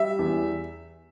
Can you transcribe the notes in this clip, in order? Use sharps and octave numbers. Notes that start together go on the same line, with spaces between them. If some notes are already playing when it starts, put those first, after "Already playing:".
Already playing: G3 E5
E2